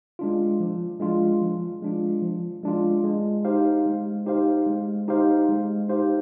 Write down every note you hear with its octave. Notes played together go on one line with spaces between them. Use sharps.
G#3 D4 F4
F3
G#3 D4 F4
F3
G#3 D4 F4
F3
G#3 D4 F4
G#3
D#4 G4 C5 F5
G#3
D#4 G4 C5 F5
G#3
D#4 G4 C5 F5
G#3
D#4 G4 C5 F5